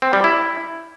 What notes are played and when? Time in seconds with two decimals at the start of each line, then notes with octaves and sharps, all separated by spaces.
0.02 C4
0.13 G3
0.24 E4